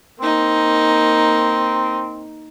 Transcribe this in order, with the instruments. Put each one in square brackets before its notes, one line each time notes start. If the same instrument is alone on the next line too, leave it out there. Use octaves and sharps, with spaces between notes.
[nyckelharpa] A#3 D#4 [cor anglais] C4